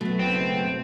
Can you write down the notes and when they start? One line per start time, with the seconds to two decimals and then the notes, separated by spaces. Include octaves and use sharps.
0.01 B2 F#3 A3 B3
0.19 F#1 C4